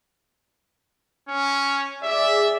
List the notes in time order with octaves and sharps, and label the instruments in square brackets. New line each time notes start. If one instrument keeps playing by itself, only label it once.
[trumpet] C#4
[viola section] G#4 D5 [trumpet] E5